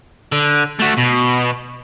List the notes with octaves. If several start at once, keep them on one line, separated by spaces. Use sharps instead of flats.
D3
A3 F#4
B2